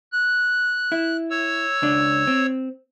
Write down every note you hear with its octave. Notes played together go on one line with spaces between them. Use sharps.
F#6
E4
C#5 E6
C#2 D4
C4